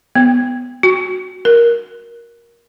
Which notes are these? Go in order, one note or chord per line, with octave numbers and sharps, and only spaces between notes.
B3
F#4
A#4